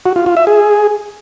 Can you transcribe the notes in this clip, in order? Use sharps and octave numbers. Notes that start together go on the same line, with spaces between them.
F#4
F4
F4
E5
G#4